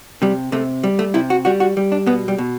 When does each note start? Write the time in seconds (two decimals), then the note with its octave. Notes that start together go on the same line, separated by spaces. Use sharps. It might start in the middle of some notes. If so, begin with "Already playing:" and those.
0.22 C3 G3
0.52 C3 A3
0.83 G3
0.99 A3
1.14 C3 E4
1.30 F#4
1.45 G3 F#4
1.60 F#4
1.77 G3
1.92 D4
2.06 B2 B3
2.28 G3
2.38 B2